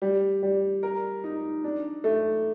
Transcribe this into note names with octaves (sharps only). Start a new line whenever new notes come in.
G3
G3
A#4
D#4
D4
A3